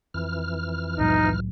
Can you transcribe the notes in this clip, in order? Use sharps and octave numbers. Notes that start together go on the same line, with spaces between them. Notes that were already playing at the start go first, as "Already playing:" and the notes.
F2 E3 F6
C2 A2 F#3 D#4